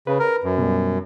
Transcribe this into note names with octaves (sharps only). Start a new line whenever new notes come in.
C#3 B4
A#4
F#2
B2 G3